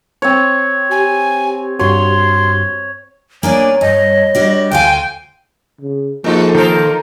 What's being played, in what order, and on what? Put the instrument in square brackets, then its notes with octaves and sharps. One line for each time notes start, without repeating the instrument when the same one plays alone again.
[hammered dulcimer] C4 C#5
[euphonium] G4 [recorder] G#5
[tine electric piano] G2 F#4 [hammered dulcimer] C#5 [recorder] C6
[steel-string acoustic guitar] A#3 D4 D5 [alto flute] C#5 [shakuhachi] G#5
[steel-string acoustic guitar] G2 [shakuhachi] D#5
[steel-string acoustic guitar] G3 D4 F#4
[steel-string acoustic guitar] D2 C5 F5 [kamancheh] G5 G#5
[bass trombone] C#3
[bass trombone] F3 [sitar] G#3 F#4 A4 [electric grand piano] A#3 D#4 F4
[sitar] B2 A4 C5 [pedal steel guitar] D#3 A#4